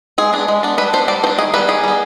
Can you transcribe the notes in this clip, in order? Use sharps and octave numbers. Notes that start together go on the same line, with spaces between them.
G#3 G#4
B3 D4
G#3
B3 D4
G3 B4
B3 D4 C5
G3 D5
B3 D4 C5
D#3 G#4
G3 B3 B4
D#3 G#4
G3 B3